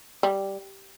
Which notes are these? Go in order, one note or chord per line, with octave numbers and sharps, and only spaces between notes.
G3